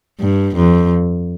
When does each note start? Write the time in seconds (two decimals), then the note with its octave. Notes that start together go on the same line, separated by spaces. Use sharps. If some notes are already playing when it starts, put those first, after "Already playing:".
0.20 G2
0.56 F2